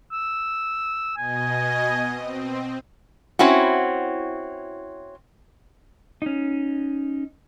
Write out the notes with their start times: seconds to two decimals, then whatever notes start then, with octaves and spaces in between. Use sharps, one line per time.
0.12 E6
1.17 B2 D#5 G#5
2.13 C4
3.39 C4 C#4 E4 F#4
6.22 C#4 D#4